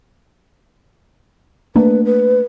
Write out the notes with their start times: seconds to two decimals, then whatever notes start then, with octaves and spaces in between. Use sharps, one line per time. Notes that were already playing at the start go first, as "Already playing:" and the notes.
1.76 A3 A#3 D4 B4
2.05 B4